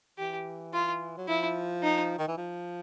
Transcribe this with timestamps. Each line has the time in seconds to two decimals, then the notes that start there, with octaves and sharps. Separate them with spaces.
0.18 E3 G4
0.73 F4
1.17 F#3
1.28 F3 E4
1.83 D#4
2.19 D#3
2.28 E3
2.38 F3